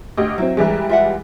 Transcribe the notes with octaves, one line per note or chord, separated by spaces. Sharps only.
D2 G4 D#5
F#3 C4 E4
E3 G3 G#3 E4 A#4
F4 E5 F#5